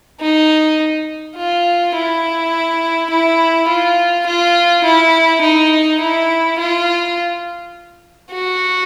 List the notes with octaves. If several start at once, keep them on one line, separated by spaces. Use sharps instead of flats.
D#4
F4
E4
E4
F4
F4
E4
D#4
E4
F4
F#4